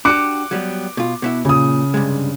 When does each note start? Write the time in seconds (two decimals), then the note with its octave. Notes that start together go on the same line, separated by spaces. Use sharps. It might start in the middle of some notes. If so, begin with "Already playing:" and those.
0.05 D4 F#4 G4 D6 F#6 C#7
0.51 F#3 G3 B3
0.97 B2 F4
1.22 B2 B3 E4
1.45 A#2 C#3 D#6
1.94 G2 C3 G#3